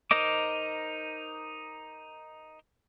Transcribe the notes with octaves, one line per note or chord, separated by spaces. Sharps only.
D#4 A#4 C5 D#5 D6